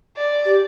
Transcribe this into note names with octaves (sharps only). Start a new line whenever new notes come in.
D5
G4